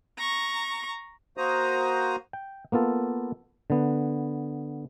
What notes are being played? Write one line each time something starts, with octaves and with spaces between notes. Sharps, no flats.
A#5 C#6
A#3 F#4 C5 A#5 D#6
G5
A#3 B3 F4 A4
D3 B3